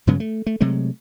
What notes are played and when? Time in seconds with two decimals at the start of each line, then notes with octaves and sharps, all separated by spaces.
0.07 G2 C#3 F#3 B3
0.20 A3
0.46 A3
0.60 C3 F#3 G#3 A3